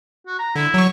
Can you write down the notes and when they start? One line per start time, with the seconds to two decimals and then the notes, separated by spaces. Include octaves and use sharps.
0.26 F#4
0.39 A#5
0.56 D3 E4
0.74 F#3 C#6